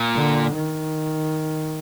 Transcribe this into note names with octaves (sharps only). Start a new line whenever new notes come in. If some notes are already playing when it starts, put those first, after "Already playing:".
Already playing: A#2
D3
D#3